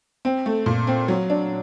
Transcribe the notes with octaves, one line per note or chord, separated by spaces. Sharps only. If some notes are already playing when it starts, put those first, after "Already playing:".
C4
A3
A#2
C4
F#3
D4